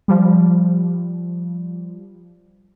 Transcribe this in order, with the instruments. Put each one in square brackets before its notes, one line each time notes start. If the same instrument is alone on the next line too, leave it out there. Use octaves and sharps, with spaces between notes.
[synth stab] F3 G3